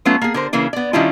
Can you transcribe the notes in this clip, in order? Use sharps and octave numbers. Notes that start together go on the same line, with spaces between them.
F#3 A3 B3 C#4 F4
A#3 G#4
D3 A#4 C5
C#3 E3 A#3 C#4
B3 D5
D#3 G3 C#4 D4 E4 F4